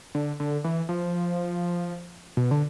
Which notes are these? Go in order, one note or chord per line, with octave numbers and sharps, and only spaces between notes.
D3
D3
E3
F3
B2
D3